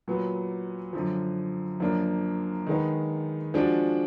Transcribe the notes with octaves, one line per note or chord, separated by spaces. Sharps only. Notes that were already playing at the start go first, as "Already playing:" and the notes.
A#2 F#3 B3
F#2 D3 F3
F#2 F3 A#3 D4
D#3 G#3 B3 D#4
F3 G#3 D4 F#4